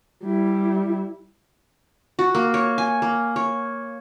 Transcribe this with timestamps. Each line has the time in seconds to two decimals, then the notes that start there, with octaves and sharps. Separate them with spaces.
0.24 G3 E4
2.19 F#4
2.35 A#3
2.54 C#5
2.78 G#5
3.02 A#3
3.36 C#5